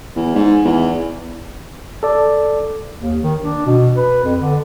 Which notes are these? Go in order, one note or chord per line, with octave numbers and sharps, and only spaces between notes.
E2
G#2
E2
A4 D5
D#2
D#3
D4
B2
B4
F2
D3